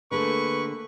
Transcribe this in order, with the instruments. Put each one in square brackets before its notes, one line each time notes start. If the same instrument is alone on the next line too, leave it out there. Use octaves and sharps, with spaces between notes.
[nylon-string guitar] D3 G#4 [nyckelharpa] A3 A#3 [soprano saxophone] B4 [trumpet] C#6